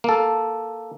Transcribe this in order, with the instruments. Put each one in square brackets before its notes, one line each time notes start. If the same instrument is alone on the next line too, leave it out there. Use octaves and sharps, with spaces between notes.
[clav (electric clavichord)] A#3 A4